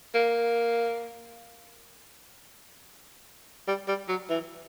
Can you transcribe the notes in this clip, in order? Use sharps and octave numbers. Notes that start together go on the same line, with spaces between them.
A#3
G3
G3
F#3
E3